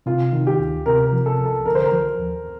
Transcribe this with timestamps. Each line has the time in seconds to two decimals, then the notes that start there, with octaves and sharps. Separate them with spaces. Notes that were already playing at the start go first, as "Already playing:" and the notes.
0.06 C3 F4
0.33 D#3
0.47 G4
0.60 D2
0.86 C3 A#4
1.06 A#4
1.13 F3
1.26 A4
1.40 C2
1.46 A4
1.66 D3 A#4
1.75 C5
1.84 A#4
1.92 F3
2.19 D#2